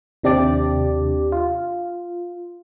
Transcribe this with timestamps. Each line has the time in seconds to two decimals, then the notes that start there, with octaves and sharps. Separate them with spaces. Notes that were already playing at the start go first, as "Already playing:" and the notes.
0.23 D#2 C3 D4 G4 D5
1.32 F4